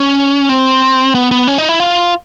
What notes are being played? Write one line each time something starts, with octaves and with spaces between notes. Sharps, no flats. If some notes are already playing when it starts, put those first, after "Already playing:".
Already playing: C#4
C4
B3
B3
C#4
D#4
E4
F4